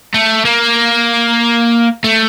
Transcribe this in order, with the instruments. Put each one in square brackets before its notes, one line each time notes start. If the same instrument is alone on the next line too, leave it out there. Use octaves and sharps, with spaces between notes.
[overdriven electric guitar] A3
A#3
A3